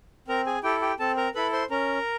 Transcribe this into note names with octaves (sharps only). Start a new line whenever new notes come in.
C4 A#4 A#5
G#4 G#5
E4 G4 A4 G5
G4 G5
C4 A4 A5
A#4 A#5
E4 A4 B4 B5
C5 C6
C#4 A#4 A#5